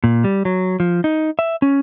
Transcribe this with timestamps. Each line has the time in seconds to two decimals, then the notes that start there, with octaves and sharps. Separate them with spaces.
0.04 A#2
0.24 G3
0.45 F#3
0.80 F3
1.04 D#4
1.39 E5
1.62 C#4